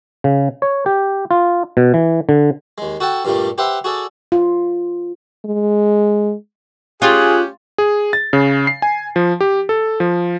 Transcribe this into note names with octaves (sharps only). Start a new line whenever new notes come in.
C#3
C#5
G4
F4
B2
E3
D3
D#2 G#3
F#4 A4 F#5 G5 A5
G2 A#2 G3 A3
G4 B4 C5 E5 F#5 C6
F#4 G#4 A4 D5
F4
G#3
C#4 F4 G4 G#4 F#6
G#4
A6
C#3
C7
G#5
F3
G4
A4
F3